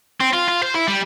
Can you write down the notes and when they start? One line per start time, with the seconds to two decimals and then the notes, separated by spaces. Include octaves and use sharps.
0.20 C4
0.33 F4
0.48 F4
0.63 C5
0.75 E4
0.87 G3